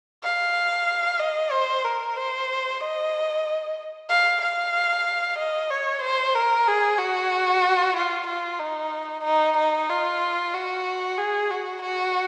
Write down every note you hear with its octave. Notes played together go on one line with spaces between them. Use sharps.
F5
D#5
C5
A#4
C5
D#5
F5
F5
D#5
C#5
C5
A#4
G#4
F#4
F4
F4
D#4
D#4
D#4
F4
F#4
G#4
F#4
F#4